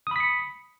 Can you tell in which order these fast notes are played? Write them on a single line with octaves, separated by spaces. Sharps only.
D#6 B5 B6 C#7